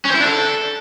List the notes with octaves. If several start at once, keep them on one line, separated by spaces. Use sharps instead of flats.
C#4
C5
E4
D4
A4